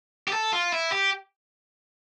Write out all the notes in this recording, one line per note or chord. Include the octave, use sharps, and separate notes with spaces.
G4
A4
F4
E4
G4